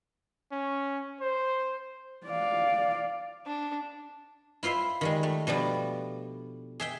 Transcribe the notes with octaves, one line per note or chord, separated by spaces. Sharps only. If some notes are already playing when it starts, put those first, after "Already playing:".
C#4
C5
D5 F5
D4
E4 F4 C5 E5 C6
D#3 G3 G#3
A3
B2 F3 G3 D4
G#4 E5 G5